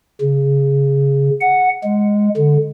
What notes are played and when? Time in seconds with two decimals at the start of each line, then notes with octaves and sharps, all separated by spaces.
0.21 C#3
1.41 F#5
1.84 G#3
2.37 D3